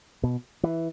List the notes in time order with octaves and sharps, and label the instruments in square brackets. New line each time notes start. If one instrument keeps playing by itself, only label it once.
[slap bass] B2
E3